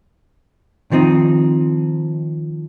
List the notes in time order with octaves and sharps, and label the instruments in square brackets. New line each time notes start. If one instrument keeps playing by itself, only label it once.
[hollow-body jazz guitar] D#3 F3 C4 D#4